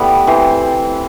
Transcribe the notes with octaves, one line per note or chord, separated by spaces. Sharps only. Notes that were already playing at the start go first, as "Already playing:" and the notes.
Already playing: E3 G3 A3 B3 A4 B4
E3 C4 C5